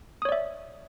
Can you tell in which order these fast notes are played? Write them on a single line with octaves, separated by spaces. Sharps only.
D#6 C#5 D5 E5